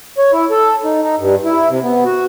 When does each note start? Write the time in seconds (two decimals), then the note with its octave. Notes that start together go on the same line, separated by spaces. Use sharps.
0.18 C#5
0.33 E4
0.51 A4
0.84 D#4
1.03 D#4
1.19 G2
1.45 E4
1.69 C3
1.83 B3
2.05 F#4